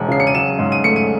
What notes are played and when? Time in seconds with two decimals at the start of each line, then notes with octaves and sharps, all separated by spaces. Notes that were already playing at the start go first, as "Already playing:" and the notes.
Already playing: E1 E2
0.08 C#3 C7
0.20 C#7
0.27 D#7
0.34 F#3 E7
0.59 G#2
0.72 D#7
0.84 A3 C#7
0.96 D#7